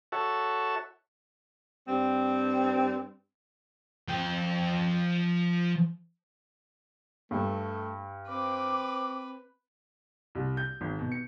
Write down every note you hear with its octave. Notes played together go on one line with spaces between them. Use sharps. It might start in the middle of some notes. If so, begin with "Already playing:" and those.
F#4 A4 C#5 E5
G2 G3 C4
F3 G5
G2 A3
C4 B4 D6
C2
G6
G#1
B2
C#7